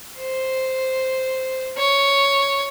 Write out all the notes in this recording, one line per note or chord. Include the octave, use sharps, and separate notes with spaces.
C5
C#5